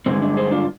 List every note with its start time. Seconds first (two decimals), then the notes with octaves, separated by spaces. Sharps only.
0.06 G2 D3 G#3 C4
0.22 D4
0.37 G#4 C5
0.51 D4 F4